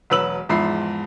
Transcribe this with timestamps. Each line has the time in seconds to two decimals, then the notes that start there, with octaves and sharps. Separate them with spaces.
0.10 E1 F#3 B4 E6 F#7
0.49 E2 G#2 F3 E5 B5 C7